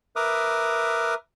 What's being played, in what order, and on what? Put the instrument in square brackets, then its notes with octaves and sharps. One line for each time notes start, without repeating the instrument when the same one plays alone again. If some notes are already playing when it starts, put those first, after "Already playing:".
[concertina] A#4 B4 E5 D6 D#6 F6